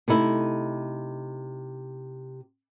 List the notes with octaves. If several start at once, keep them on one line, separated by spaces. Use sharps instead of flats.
C3 A3 D#4 E4